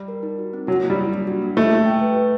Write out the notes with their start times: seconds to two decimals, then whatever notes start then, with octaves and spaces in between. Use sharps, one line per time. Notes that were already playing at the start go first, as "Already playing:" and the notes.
Already playing: G3
0.08 A#4
0.23 D#4
0.39 F#4
0.53 C4
0.67 F#3 F#4
0.83 A#3
0.90 G3
0.98 A#3
1.13 D4
1.27 F#4
1.42 A#3
1.57 A3 E5
1.72 G4
1.86 G5
2.02 B4
2.17 E5